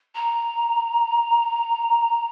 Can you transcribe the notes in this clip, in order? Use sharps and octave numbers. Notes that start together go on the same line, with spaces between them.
A#5